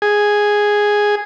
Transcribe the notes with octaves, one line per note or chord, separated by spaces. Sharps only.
G#4